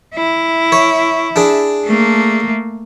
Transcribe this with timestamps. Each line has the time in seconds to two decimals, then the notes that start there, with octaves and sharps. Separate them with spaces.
0.15 E4
0.72 C#5
1.36 D4 G#4
1.85 A3 A#3